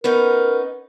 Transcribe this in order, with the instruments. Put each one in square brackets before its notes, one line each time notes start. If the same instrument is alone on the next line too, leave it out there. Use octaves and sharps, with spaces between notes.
[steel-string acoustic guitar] B3 C#4 D#4 [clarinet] A#4